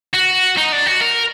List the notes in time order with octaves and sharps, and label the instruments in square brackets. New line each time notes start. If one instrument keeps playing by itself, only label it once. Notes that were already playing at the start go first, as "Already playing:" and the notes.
[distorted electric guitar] F#4
D#4
D4
F#4
A#4